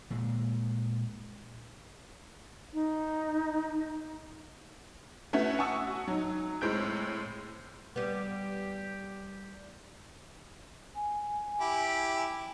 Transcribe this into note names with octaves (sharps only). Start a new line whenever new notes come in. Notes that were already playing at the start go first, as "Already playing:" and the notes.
A#2 G#3
D#4
A3 B3 C#4 E4 F#4 C#5
F#5 G#5 A5 C#6 D#6 E6
F#4
F#3 D#4
A2 G#3 C4 G6 D7
G3 B3 G4
G#5
E4 G4